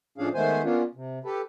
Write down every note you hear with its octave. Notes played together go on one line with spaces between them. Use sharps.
A2 F3 C#4 D4 G#4 F5
D#3 G#3 A3 B3 C5 G#5
A#3 B3 C#4 D4 F4
C3
G4 A4 B4